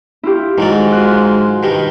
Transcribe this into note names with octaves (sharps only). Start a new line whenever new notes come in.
E4 F4 G4
G#2 D#3 F#3 D5
F4 F#6
G2 D#3 G3